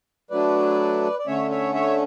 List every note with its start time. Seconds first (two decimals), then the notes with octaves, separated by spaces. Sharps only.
0.31 F#3 A3 D4 B4 D5
1.19 D5
1.26 D3 A3 C#4 C#5 E5
1.51 C#5 E5
1.74 C#5 E5